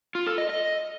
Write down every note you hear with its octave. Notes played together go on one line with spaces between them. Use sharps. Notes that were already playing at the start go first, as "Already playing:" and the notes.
F4
A4
D#5
D#5